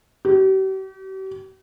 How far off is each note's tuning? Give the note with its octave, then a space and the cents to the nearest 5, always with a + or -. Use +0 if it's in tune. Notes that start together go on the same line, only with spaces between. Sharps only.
G4 -45